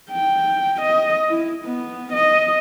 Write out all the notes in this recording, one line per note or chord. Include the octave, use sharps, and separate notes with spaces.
G5
D#5
E4
B3
D#5